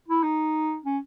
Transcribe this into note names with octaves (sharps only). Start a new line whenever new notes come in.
E4
D#4
C#4